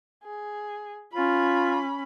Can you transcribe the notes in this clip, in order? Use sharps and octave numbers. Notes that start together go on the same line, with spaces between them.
G#4
C#4 F4 B5